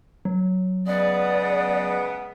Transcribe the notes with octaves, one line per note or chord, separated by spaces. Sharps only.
F#3
C#3 G#3 B3 D5